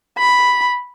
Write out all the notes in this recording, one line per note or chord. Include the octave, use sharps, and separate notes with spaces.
B5